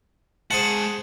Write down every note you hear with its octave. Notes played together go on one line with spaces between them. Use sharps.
G#3 G#4 C5 F#5 A5